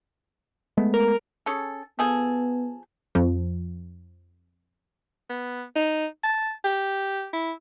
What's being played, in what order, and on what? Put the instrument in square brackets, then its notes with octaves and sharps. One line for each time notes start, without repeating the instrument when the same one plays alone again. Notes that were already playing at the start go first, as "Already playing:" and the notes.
[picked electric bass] G#3 A3 B3
[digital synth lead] A#4
[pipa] C#4 G#4 A4
[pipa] F3 G#4 A4 [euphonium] B3
[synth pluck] F2 F3
[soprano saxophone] B3
D#4
A5
G4
E4